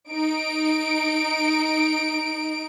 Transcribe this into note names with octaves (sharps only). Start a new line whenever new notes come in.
D#4 D7